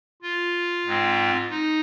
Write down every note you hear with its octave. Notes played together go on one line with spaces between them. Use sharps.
F4
G#2 G#3 C4
D#4